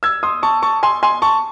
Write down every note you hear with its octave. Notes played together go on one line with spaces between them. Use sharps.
E6 G#6
C6 D#6
A5 C#6
A5 C#6
G#5 C6
G#5 C6
A5 C#6